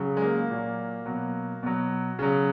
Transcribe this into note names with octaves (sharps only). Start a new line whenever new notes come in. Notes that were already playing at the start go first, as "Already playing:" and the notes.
Already playing: C#3 F#3
G#3
A#3
A#2 F#3
B2 F#3
B2 F#3
C#3 F#3